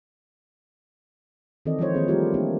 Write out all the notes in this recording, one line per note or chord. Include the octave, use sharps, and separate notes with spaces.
D#3 E3 C4 A4 D5 D#5
F3 G#3 E4 F4 C5 C#5
D#3 E3 A#3 C4 G#4
G3 A3 E4 F4 G4 A#4
A#3 C4 D4 D#4 F4 G4